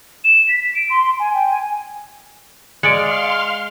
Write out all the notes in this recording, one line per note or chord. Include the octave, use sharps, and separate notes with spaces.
E7
B6
D7
C6
G#5
G5
G#5
G#3 D5 F5 C6 F6 C#7 D7